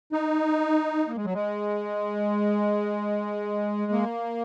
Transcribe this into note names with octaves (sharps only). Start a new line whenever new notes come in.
D#4
A#3
G#3
F#3
G#3
A#3